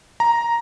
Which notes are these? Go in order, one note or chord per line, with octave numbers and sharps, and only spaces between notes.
A#5